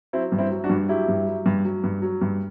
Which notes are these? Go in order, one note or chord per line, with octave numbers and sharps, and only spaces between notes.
F#3 C4 E4
G2
C4 E4
F#3
D4 F#4
G2
F#3 E4 G4
G2
F#3
G2
F#3
G2
F#3
G2